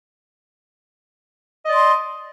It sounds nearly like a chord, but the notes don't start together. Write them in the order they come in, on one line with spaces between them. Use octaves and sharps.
D#5 D5 C6